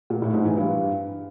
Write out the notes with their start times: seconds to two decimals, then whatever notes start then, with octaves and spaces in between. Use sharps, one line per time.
0.10 A#2
0.22 A2
0.34 G#2
0.45 E3
0.57 G2